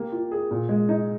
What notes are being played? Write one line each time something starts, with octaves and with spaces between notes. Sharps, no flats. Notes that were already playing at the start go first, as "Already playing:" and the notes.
Already playing: A#3 G4
F4
G#4
A#2
G#3
D#4